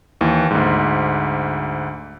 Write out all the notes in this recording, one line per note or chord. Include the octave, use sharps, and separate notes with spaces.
D#2 E3
D2 G#2